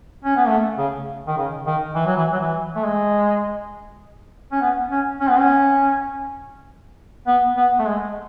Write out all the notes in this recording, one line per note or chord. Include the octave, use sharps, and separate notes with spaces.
C#4
B3
A3
C#3
D#3
C#3
D#3
E3
F#3
E3
F#3
E3
A3
G#3
C#4
B3
C#4
C#4
B3
C#4
B3
B3
A3
G#3